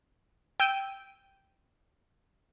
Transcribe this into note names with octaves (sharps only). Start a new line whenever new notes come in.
G5 E6 G6 D#7